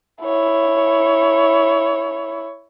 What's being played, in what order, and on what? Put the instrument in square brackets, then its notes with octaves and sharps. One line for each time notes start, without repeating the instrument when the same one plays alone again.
[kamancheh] E4 C#5